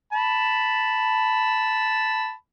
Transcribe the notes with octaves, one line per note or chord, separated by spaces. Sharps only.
A5 B5